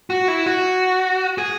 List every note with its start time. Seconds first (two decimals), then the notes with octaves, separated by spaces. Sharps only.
0.10 F#4
0.28 E4
0.46 F#4
1.38 G#4